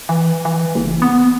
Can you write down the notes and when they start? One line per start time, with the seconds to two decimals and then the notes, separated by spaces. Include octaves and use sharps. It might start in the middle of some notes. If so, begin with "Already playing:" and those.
0.09 E3
0.45 E3
0.75 F#1
1.02 B3